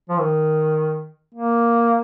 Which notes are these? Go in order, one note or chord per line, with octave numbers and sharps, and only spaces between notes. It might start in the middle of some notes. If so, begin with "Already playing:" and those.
F3
D#3
A#3